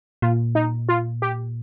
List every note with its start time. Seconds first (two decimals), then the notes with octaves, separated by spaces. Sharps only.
0.22 A#2 F4
0.55 D#4
0.89 F4
1.22 G4